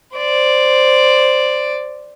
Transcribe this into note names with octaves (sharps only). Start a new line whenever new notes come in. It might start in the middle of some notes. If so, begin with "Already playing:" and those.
C5 D5